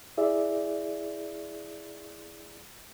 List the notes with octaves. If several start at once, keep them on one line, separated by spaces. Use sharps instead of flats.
E4 G#4 D5 E5